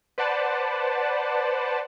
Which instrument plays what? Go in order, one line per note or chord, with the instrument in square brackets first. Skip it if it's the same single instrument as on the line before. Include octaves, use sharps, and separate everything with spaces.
[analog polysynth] B4 C5 D5 F#5 A5